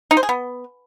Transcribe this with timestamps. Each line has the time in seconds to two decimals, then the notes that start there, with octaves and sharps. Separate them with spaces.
0.11 D#4
0.17 C5
0.23 G#4
0.29 B3